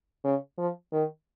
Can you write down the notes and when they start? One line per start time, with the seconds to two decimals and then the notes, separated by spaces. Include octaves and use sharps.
0.24 C#3
0.58 F3
0.93 D#3